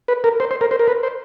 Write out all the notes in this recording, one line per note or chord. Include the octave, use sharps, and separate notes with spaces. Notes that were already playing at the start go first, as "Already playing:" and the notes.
B4
A#4
C5
C5
A#4
C5
A#4
B4
C5